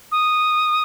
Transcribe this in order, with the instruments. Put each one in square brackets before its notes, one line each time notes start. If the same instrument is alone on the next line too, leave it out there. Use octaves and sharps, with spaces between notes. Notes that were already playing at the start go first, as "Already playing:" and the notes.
[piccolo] D#6